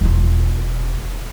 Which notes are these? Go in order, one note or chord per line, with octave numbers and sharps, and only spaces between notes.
E1 F4